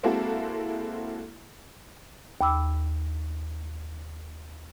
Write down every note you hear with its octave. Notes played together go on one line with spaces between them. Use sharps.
G#3 A#3 C4 E4 F#4 A4
D#2 B5 D6 E6